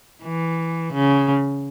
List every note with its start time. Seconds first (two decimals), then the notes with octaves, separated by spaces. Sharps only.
0.22 E3
0.93 C#3